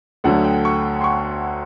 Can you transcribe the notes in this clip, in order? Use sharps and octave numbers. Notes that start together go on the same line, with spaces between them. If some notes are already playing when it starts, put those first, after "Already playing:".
D2 D3 F#3 A3 F#5
G5
C#6
C6
C#6